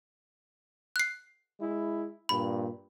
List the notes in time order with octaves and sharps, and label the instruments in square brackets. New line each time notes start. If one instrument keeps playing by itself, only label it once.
[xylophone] F#6 C7
[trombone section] G#3 E4
[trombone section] G2 A#2 [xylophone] B5